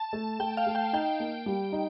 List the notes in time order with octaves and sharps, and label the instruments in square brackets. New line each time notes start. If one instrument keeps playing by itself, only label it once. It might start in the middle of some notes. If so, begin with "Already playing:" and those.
Already playing: [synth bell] A5
[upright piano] A3
[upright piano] A3 [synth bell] G5
[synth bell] F5
[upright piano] A3
[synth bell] G5
[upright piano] D#4 [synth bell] G5
[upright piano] A#3
G3
D#4